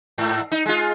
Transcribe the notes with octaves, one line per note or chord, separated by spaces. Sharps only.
G#2
D#4
G#3 F4